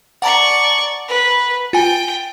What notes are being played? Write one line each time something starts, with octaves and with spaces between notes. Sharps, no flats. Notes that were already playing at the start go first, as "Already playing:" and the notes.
D5 F#5 A5 A#5 C#6
B4
F4 G5 G#5